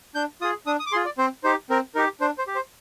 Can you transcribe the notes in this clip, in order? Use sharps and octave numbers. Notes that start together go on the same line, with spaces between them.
D4 G6
F4 G#4 D#6
D4 D#6
D#6
D6
F4 G#4 C6
D5
C4 C5
D#4 G4 C5
C4 A#4
D#4 G4 A#4
D4 C5
C5
G4
C5